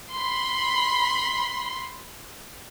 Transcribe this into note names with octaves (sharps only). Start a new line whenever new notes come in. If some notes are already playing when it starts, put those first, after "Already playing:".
B5 C6